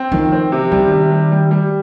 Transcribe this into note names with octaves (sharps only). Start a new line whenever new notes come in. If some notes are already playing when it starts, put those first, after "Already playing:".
Already playing: C4
D#3 F3
C4
C3
D#3 G3
C3
G3
G3
G3